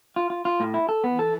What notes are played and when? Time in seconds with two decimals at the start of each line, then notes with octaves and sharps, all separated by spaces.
0.16 F4
0.30 F4
0.45 F4
0.60 A2
0.74 E4
0.89 A4
1.04 E3 B3
1.19 A4